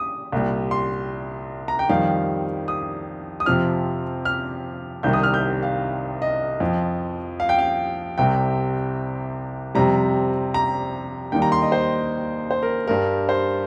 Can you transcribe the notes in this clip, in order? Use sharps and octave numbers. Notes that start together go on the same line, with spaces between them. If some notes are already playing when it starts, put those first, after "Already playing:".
Already playing: D#6
C2 A#2 G3
C6
A#5
G5
F2 D#3 G3 F5
D#6
D#6
F2 C3 F3 F6
F6
C2 C3 D#3 G3 G6
D#6
F6
G6
F5
D#5
F2 F3
F5
G5
F5
C2 C3 G3 G5
F2 C3 G3 A#5
A#5
D#2 D#3 G3 G5
A#5
C6
D#5
C5
C5
A#4
G2 G3 A#4
C5